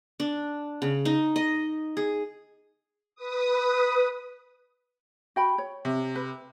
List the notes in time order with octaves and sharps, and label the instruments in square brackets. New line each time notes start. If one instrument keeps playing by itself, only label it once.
[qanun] D4
C#3
D#4
D#5
G#4
[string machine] B4 D#6
[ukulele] F#4 G5 B5
C#5
[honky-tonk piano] C3
[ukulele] B4